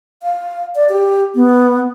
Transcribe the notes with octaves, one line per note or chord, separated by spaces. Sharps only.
F5
D5
G4
B3